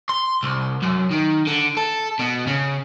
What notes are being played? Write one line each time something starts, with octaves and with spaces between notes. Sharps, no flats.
C6
C2
F#2
D#3
D3
A4
B2
C#3